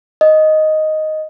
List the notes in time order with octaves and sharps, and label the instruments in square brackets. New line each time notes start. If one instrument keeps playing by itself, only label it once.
[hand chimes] D#5